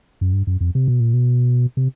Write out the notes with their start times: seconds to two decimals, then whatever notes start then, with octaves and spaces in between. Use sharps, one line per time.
0.21 F#2
0.33 G2
0.47 F#2
0.61 F2
0.75 C3
0.88 B2
1.00 A#2
1.13 B2
1.77 C3